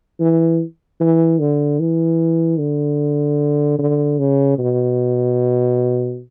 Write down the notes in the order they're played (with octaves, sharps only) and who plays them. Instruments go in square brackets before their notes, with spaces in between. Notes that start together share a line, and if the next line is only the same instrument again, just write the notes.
[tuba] E3
E3
D3
E3
D3
D3
C#3
B2